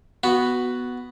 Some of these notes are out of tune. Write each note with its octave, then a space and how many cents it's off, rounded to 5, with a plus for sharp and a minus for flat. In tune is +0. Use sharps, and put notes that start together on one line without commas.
B3 +0 F#4 +0